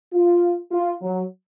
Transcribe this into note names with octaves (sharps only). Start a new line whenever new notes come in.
F4
F4
F#3